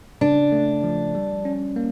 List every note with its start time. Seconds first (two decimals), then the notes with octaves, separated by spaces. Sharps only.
0.21 C#3 D4
0.52 A3
0.83 F3
1.15 G3
1.45 C#4
1.76 A#3